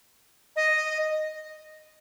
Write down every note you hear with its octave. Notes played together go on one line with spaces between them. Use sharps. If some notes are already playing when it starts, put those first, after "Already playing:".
D#5